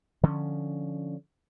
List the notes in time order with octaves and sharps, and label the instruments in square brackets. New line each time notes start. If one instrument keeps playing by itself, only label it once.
[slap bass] D3 F3 C#4